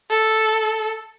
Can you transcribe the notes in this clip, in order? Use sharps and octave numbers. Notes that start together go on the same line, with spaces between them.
A4